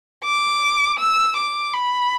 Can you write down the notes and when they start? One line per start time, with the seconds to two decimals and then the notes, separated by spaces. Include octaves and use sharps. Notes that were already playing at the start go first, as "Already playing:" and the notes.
0.25 D6
0.99 E6
1.37 D6
1.74 B5